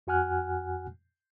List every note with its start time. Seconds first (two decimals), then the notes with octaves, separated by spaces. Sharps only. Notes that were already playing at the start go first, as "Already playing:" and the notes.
0.07 F2 F#4 F#5 G#5 F6 F#6